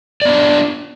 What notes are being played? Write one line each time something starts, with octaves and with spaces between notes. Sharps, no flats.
B3 D4 F4 D5